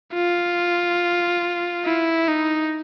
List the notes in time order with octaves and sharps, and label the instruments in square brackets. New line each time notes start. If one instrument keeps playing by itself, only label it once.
[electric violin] F4
E4
D#4